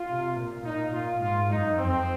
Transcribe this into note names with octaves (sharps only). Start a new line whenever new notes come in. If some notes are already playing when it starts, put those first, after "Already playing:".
Already playing: F4
C3
A#2
A#2 D#4
A#2 F4
G#2 F4
F#2 D#4
F2 C4